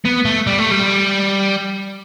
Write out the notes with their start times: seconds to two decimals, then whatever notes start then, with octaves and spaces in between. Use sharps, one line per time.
0.05 B3
0.25 A3
0.47 G3
0.59 A3
0.71 G3